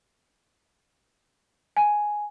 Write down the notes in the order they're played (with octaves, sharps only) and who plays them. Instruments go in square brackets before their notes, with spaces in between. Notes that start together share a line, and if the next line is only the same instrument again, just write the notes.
[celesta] G#5